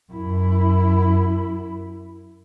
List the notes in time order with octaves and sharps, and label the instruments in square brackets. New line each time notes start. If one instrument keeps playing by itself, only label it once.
[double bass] F#2 E4